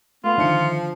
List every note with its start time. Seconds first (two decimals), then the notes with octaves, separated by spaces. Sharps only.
0.24 A3 B3 F4
0.38 D3 D#3 F3 E5 C#7